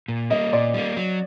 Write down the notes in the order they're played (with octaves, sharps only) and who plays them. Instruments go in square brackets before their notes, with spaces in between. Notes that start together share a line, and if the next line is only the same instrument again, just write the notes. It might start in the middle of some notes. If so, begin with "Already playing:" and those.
[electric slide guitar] A#2
[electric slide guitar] G3 A#3 [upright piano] D#5
[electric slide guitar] A#2 [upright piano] D5
[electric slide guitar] G3 A#3
F#3